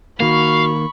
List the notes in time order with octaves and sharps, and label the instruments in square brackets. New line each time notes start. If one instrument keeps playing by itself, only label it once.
[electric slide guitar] D#3 A#3 [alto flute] F#4 [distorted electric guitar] F5 [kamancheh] B5 C#6